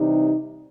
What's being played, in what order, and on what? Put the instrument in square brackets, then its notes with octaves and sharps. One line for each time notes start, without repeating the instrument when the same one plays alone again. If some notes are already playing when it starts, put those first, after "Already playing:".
Already playing: [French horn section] C3 E3 G3 D#4